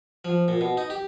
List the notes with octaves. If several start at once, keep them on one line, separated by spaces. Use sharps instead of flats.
F3
A#2
B2
D#4
G4